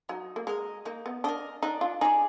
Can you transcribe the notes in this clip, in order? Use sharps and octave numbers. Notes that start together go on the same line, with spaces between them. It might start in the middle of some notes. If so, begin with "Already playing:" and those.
F#3 D#4
A#3
G#3 A#4 D#5
A#3 D#4
B3
D4 A#4 D#5
D4 D#4
F4
D#4 G#4 D5